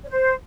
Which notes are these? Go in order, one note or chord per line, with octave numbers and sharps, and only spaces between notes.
C#5
C5